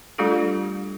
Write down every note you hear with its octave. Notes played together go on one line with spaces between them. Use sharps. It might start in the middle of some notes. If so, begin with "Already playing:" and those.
G3 A3 D4 F4 G4 A4